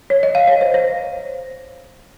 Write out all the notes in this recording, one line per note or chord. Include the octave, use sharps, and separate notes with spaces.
C#5
D#5
F5
C#5
C5
C5